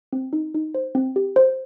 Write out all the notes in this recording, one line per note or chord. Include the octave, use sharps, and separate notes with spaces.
C4
D#4
D#4
C5
C4
G4
C5